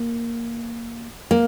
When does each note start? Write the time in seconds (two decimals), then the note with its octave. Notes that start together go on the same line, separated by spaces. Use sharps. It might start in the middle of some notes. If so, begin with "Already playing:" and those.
Already playing: A#3
1.31 A#3